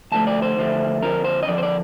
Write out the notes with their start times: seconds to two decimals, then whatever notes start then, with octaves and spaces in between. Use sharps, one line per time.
0.12 D2 D3 F3 A3 A5
0.27 D5
0.42 C5
0.58 D2 D3 F3 A3
1.02 F2 D3 F3 A#4
1.24 C5
1.43 D#5
1.47 F2 D3 F3 D5
1.58 C5
1.63 D5